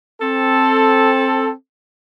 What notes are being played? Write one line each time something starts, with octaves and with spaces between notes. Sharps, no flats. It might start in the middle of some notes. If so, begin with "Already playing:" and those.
C4 A4